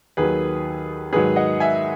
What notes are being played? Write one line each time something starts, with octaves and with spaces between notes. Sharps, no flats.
D#2 D#3 F#3 G#4 B4
G#2 D#3 F#3 G#4 B4
D#5 F#5
E5 G#5